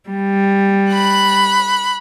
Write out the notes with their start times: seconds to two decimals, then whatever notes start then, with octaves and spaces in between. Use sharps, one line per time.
0.10 G3
0.93 B5 F#6